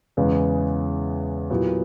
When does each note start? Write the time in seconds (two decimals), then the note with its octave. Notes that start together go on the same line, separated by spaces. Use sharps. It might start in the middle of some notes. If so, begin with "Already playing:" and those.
0.17 E2 C#3 E3 G#3 B3
1.50 A#2 F#3 B3 E4 G4